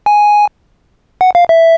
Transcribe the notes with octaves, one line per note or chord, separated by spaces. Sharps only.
G#5
F#5
F5
E5